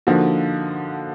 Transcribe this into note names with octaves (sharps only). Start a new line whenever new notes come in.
D3 F3 A#3 D#4 F#4